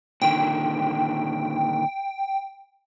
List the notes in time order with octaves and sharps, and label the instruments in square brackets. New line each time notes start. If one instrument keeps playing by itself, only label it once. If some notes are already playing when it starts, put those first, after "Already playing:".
[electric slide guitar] A#2 D3 D#3 [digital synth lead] G5